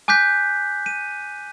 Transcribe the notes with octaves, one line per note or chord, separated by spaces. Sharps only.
G#5 D6 F#6 G6 B6
D#7